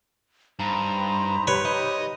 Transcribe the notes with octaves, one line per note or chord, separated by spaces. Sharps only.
G2 D#4 C5 A#5 B5
G4 B4 C#5
D#5